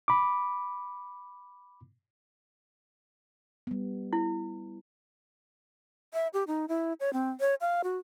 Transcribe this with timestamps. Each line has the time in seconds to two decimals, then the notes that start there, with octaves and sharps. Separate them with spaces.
0.08 B5 D6
3.67 G3 B3
4.13 E4
6.14 E5
6.34 G4
6.47 D#4
6.68 E4
7.00 C#5
7.13 C4
7.40 C#5
7.61 F5
7.84 F#4